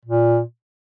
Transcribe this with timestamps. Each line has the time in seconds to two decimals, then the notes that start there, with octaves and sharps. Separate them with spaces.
0.05 A#2